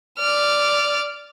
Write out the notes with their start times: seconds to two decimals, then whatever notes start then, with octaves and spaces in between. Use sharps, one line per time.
0.18 D5 F6